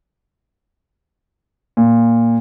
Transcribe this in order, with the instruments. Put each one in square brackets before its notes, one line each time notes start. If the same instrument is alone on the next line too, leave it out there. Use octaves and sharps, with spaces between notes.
[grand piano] A#2